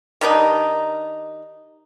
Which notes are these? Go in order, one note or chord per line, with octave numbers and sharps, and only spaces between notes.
D#3 G3 D4 D#4